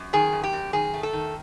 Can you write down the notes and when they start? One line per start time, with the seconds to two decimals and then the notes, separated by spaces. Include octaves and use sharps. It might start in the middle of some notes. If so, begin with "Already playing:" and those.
Already playing: F#2
0.13 D#3 G#4
0.33 F#2
0.44 G4
0.53 F#2
0.73 D#3 G#4
0.94 A3
1.03 A4
1.13 D#3